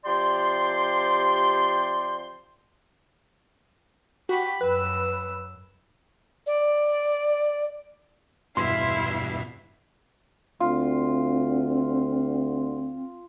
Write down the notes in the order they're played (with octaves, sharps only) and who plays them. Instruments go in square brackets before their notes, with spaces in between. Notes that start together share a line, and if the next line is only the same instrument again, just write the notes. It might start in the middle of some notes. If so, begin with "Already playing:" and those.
[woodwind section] C3 F3 G4 D5 G5 C6
[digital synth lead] F#4 [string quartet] G4 B5
[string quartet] F#2 E6 [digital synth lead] B4
[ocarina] D5
[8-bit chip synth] E2 G2 B2 [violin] E4 [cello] E5 F5 [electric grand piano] C6
[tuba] D2 [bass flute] C4 [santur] F4